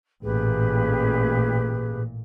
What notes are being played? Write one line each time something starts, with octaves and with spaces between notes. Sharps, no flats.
A1 A#2 G4 G#4 B4